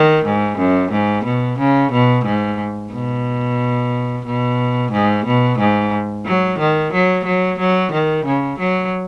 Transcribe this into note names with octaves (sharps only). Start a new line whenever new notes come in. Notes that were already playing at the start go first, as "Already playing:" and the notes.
Already playing: D#3
G#2
F#2
G#2
B2
C#3
B2
G#2
B2
B2
G#2
B2
G#2
F#3
D#3
F#3
F#3
F#3
D#3
C#3
F#3